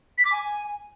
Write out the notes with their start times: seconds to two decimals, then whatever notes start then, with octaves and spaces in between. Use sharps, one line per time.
0.17 B6
0.25 D6
0.32 G#5